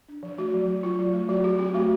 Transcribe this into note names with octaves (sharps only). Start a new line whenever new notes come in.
D4
F3
A3 F#4
F#3
F#3
F#3 F4
F#3
A3
F#3 F#4
F#3 G4
C4 G4
A3 F#4